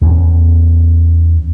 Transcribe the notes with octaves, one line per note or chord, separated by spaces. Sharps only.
E2 C#4